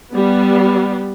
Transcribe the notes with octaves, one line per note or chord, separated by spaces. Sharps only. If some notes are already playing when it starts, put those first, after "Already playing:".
G3 B3